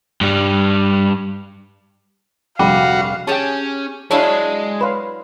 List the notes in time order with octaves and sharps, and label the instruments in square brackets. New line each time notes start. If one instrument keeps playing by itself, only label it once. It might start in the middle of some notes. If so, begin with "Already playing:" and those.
[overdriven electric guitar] G2 G3
[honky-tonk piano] F1 A#1 G3 [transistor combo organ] F#4 [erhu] F5 [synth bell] G5 B5 D6
[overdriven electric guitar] C#4 [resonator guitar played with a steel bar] G4 G#4 [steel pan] G5 A5
[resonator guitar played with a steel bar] F#3 D4 E4 [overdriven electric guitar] G#3 [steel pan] C#5 F5 [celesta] D5 A5
[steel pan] B4 C#5 F5 [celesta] B5 C6